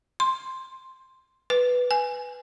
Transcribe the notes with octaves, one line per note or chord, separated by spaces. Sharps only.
C6
B4
G#5